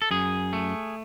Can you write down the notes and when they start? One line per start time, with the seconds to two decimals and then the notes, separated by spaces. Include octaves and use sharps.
0.02 A4
0.11 F#2 G#4
0.53 A3